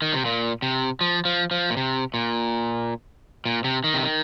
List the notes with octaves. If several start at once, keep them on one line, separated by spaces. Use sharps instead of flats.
D#3
C3
A#2
C3
F3
F3
F3
A#2
C3
A#2
A#2
C3
D#3
C3
D#3